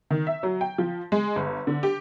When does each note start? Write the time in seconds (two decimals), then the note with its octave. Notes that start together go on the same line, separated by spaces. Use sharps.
0.10 D#3
0.27 E5
0.43 F#3
0.61 G5
0.78 F3
1.12 G#3
1.36 G1
1.67 D3
1.83 G4